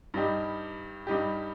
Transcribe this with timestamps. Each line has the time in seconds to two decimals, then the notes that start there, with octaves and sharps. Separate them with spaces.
0.14 G2 G3 D#4 G4
1.07 G2 G3 D#4 G4